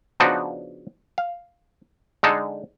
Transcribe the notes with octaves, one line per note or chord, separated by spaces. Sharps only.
C#3 F3 B3 D4 D#4 F#4
F5
D3 G#3 D#4 A4